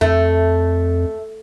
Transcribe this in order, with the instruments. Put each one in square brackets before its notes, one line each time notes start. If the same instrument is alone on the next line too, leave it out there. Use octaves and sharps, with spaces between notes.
[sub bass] F2 [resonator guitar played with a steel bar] A3